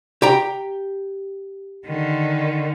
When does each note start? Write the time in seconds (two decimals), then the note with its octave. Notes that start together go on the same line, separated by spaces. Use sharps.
0.22 G4 G5 A#5
1.87 D3 D#3